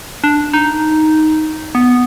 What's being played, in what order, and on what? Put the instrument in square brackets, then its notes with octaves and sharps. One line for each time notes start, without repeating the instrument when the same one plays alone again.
[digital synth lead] D4
D#4
B3